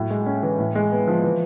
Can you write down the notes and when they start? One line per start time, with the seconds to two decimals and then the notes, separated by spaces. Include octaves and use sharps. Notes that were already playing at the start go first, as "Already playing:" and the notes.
Already playing: A2 F#3
0.10 G#3
0.26 C#4
0.43 E3
0.59 A2
0.75 G#3
0.91 B3
1.08 F3
1.24 E3